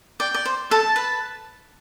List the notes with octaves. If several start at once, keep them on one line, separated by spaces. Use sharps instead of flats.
D5 G5
D5
C5
A4 A5
B4